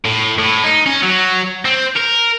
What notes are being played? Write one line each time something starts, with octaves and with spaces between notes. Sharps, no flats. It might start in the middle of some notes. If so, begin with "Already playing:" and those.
A2
A2
D#4
C#4
F#3
C4
A#4